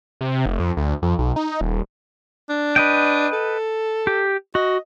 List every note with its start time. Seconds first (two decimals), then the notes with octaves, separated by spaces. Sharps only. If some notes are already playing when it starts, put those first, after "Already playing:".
0.21 C3
0.46 F1
0.60 F2
0.77 D2
1.02 F2
1.19 B1
1.36 D#4
1.61 D#1
2.49 D4
2.76 B4 D#5 G5
3.33 A4
4.07 G4
4.55 F#4 D#5